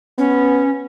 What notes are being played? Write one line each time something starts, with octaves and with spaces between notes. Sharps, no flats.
B3 C#4